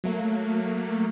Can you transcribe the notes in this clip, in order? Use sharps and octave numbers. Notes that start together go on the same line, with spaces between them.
F#3 A3 A#3